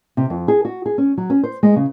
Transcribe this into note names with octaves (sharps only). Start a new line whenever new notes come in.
C3
F2
G#4
F#4
G#4
C#4
F#3
C#4
C5
G#3
C#3